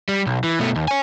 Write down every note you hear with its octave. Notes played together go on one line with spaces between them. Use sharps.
G3
B1
E3
B2 A3
D#2
C#5 G#5